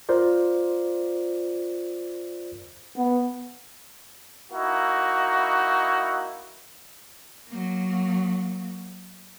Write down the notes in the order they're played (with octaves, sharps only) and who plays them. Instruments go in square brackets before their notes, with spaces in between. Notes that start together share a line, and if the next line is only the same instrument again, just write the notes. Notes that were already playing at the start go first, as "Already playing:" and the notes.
[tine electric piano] F4 A#4 C5 D5
[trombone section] B3
A#3 D#4 E4 F#4
[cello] F#3 A#3